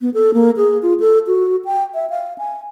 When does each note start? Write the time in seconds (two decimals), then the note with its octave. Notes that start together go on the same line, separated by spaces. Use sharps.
0.01 B3
0.14 A4
0.34 A#3
0.57 G#4
0.82 F4
1.00 A4
1.27 F#4
1.65 G5
1.94 E5
2.10 F5
2.38 G#5